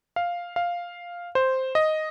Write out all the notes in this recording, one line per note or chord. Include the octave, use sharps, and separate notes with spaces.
F5
F5
C5
D#5